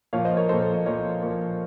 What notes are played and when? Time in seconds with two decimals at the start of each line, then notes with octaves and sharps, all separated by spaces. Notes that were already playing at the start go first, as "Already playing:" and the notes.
0.13 A#2 F3 C#5 F5
0.25 C5 D#5
0.37 A#4 C#5
0.49 A#2 F3 A4 C5
0.61 A4
0.74 D#5
0.86 A#2 F3 A#4 C#5
1.23 A#2 F3